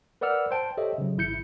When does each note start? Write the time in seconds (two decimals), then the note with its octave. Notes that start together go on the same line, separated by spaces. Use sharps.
0.21 A#4 B4 D5 F#5 E6 F6
0.51 C5 G5 A5
0.77 G4 A4 C5 C#5 D#5 E5
0.98 C#3 F#3
1.17 G#1 E4 G6 C#7